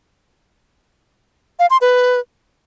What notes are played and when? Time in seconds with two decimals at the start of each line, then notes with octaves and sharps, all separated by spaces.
1.59 F5
1.70 C6
1.81 B4